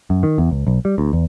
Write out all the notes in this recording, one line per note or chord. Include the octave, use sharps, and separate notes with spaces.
F#2
D#3
E2
C#2
B1
G3
D2
E2